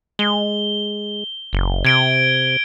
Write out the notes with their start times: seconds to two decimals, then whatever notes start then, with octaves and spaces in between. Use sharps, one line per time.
0.19 G#3 G7
1.53 F#1
1.85 C3 G#6 D7 G7